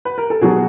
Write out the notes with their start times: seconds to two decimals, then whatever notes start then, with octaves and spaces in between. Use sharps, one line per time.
0.05 B4
0.18 A#4
0.30 A4
0.41 B2 F#3 F#4 G#4